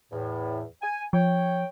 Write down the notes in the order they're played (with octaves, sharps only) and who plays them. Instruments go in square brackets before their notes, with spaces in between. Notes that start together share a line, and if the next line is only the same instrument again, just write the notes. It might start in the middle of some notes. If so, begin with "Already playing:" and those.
[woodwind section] E2 A2
G#5
[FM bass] F3 [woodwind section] C#5 G5